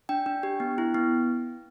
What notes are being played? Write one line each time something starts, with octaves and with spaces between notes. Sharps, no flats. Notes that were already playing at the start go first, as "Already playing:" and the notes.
D4 G5
D4
G4
B3
E4
B3